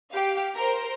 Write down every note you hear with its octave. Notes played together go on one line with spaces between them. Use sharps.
G4 F5
A#4 C5